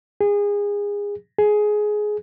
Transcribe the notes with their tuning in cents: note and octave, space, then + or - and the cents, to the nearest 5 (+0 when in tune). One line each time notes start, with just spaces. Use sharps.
G#4 -25
G#4 +15